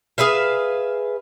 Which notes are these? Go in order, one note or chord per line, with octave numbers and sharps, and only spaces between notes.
G#4 B4 E5 F5